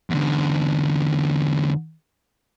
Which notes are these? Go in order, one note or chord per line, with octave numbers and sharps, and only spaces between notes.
E2 D3